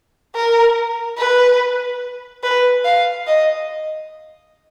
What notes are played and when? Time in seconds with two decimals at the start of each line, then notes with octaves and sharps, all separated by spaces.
0.36 A#4
1.18 B4
2.43 B4
2.85 F5
3.27 D#5